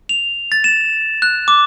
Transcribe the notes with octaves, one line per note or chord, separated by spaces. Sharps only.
F7
A6
E7
F#6
D6